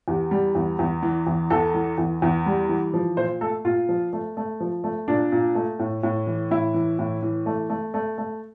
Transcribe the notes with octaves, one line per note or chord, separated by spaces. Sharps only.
E2 G4
G3
E2
E2
E3
E2
E2 A4
E3
E2
E2
G3
E3
F3
A#2 C5
A3 A4
A#2 F4
F3
A3
A3
F3
A3
A#2 D4
A#2
A3
A2
A2
E3
A2 E4
E3
A2
E3
A3
A3
A3
A3